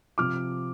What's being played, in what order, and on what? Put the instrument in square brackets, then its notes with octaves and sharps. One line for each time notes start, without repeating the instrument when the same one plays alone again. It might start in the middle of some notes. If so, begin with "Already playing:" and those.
[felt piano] C3 F3 D6 F6